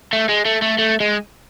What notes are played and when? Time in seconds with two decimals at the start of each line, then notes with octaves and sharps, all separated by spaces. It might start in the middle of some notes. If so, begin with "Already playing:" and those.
0.13 A3
0.29 G#3
0.45 A3
0.62 A3
0.79 A3
1.00 G#3